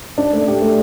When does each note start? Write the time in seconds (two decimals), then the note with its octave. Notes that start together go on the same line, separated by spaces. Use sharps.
0.18 D4
0.33 A3
0.48 G4
0.62 A3